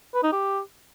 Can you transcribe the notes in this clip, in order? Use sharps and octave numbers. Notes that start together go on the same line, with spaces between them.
B4
D#4
G4